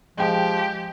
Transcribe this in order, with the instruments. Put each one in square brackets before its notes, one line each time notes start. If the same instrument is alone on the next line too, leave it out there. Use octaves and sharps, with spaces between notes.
[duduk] F3 [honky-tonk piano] G#3 G5 [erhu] G4